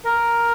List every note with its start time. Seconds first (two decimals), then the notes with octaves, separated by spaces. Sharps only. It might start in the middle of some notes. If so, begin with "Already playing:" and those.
0.06 A#4